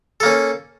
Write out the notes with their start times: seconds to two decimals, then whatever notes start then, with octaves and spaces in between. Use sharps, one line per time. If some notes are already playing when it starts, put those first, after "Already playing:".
0.20 A4
0.23 A#3
0.26 C#4